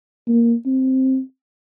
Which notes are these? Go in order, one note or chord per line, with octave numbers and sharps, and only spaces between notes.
A#3
C4